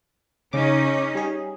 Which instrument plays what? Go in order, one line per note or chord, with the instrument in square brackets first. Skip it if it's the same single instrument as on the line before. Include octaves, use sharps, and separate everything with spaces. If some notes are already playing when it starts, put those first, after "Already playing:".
[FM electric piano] C#3 D6 [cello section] C#4 D#4
[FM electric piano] G3 G#4